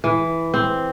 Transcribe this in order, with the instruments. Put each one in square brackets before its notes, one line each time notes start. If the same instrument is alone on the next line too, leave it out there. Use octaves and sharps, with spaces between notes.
[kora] E3
C4